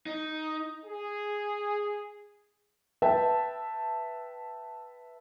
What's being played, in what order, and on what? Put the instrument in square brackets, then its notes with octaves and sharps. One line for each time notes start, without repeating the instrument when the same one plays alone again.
[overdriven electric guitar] D#4
[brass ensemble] G#4
[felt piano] B4 E5 G5 A5